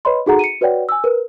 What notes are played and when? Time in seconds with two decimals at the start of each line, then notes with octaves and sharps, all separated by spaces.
0.05 B4 C#5 D#5 B5 C6
0.26 D#4 F#4 G#4 A4 F#5 A#5
0.39 C#7 D#7
0.61 F#4 B4 C#5 D5 F#5 G5
0.89 G#5 E6
1.04 A#4 B4